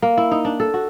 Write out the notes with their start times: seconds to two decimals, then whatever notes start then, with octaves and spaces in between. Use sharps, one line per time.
0.02 A#3
0.17 E4
0.31 D#4
0.45 D4
0.60 A4
0.74 F#4